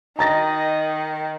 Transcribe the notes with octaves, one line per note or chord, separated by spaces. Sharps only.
D#3 D#5 A#5 A6 A#6